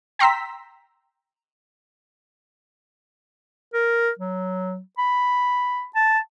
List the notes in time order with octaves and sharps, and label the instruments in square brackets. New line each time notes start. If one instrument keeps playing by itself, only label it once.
[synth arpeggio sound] G5 A#5 C6 E6 B6
[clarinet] A#4
F#3
B5
A5